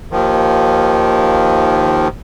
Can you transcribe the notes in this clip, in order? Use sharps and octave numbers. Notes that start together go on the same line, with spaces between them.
D#2 D#3 F3